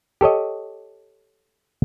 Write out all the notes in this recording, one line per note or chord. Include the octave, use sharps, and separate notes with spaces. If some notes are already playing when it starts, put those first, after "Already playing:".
G4 A4 C#5 D#5